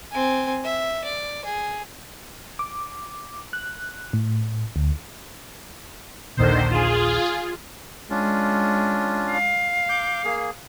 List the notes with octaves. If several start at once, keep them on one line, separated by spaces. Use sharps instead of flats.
C4 G#5
E5
D5
G#4
D6
F#6
A2
D2
A#1 D#2 A#2 D3 D#3 C5
F4 G#4
G#3 C#4 D4 F4
F5
D6 G6
A#3 G#4